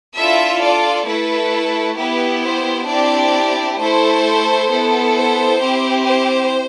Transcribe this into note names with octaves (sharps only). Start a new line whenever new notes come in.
D4 E4 F4 A4 E5
D4 D5
A3 E4 A4 B4
B3 E4 G4 B4
C5
C4 D4 E4 G4 D5
A3 E4 A4 C5
B3 E4 A4
C5
C4 E4 G4
C5